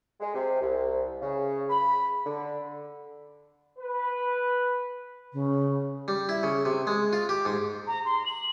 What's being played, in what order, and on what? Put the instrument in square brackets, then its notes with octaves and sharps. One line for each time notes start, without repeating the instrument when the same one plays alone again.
[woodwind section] G#3
C3
C2
C#3
B5
D3
[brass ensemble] B4
[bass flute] C#3
[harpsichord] G3
E4
C#3
C3
G#3
F4
G4
G#2
[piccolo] A#5
C6
F#7